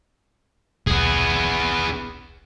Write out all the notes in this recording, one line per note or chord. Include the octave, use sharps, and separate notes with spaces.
D#1 B1 B3 G#4